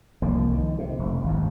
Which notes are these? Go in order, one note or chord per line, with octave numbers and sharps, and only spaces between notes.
C2 F3 A#3
D#3
C3
F1
G#1 D#2